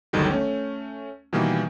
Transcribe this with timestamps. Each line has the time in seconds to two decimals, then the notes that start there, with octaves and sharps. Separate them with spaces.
0.13 G1 D2 D3 D#3 F#3 G3
0.31 A3 C#4
1.33 B2 D#3 E3 G3 A#3